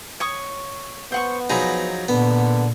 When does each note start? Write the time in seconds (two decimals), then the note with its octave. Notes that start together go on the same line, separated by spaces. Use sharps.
0.20 C#5 C#6 D#6
1.12 B3 C5 F#5 C#6
1.50 F3 F#3 D#4 G#4 A#5 B5
2.08 A#2 D3 B3